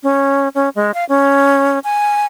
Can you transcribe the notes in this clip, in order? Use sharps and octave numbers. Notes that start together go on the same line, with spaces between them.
C#4
C#4
G#3
F5
C#4
G#5